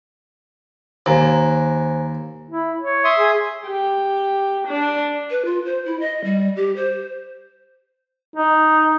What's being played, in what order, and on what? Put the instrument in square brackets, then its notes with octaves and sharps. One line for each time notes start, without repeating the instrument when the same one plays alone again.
[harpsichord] D#2 [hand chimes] C5 G#5 A#5
[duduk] E4
C#5
[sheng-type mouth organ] E5 C6 D#6
[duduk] G#4
[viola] G4
D4
[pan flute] B4
F4
C5
E4
D#5
G3
G4
C5
[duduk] D#4